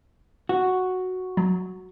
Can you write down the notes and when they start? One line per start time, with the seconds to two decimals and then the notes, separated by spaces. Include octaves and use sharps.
0.49 F#4
1.37 F#3